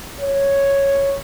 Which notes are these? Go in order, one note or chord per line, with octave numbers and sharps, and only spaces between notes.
C#5